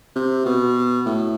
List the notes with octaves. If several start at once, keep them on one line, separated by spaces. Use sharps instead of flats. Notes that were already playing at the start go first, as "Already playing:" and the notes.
C3
B2
A2